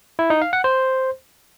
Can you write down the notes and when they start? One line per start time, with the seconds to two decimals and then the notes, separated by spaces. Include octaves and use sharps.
0.19 E4
0.30 D#4
0.42 F5
0.53 F#5
0.64 C5